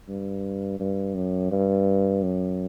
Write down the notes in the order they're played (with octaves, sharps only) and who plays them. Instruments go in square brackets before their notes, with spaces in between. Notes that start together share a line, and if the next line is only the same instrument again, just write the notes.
[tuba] G2
G2
F#2
G2
F#2